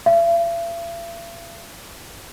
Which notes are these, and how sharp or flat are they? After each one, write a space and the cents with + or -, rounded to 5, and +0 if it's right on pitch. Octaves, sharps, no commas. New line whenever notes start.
E5 +45